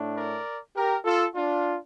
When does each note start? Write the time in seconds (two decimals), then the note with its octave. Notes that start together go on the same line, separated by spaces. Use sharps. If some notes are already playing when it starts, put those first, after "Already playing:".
Already playing: A2 A3 D4
0.16 A#4 D5
0.76 G4 A#4
1.05 F4 A4
1.35 D4 F4